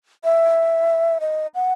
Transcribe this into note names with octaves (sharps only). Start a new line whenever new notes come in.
E5
D#5
F#5